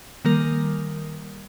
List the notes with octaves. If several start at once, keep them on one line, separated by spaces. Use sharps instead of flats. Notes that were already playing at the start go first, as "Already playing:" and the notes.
D#3 G3 A#3 A#4